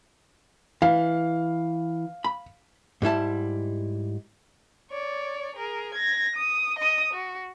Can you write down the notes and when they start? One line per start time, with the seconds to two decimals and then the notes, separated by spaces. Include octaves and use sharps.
0.82 E3 F5
2.24 B5
3.02 G#2 G3 E4 A5
4.91 C#5 D5
5.56 G#4 A#4
5.94 G#6 A#6
6.35 D#6
6.79 D#5 D#6
7.13 F#4